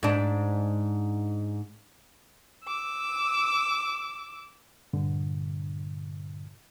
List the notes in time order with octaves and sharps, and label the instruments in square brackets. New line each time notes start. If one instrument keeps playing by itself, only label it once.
[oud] G#2 D4
[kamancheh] D6 E6
[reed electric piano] G2 A#2 D3